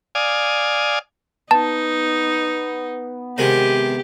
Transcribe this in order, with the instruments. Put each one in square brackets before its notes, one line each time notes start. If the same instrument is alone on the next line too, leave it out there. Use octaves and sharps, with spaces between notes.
[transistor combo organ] D5 F5 G#5 D#6
[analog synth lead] B3 [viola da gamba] D#4 [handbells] A5
[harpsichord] C3 D#3 G#3 [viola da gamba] G4